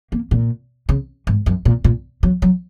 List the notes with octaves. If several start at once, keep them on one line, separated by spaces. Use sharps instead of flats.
A#3
A#2
C#3
G#2
F#2
A#2
A#2
F#3
F#3